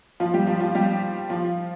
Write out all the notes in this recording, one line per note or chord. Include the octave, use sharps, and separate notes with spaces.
F3 F4
G3 G4
F3 F4
F3 F4
G3 G4
F3 F4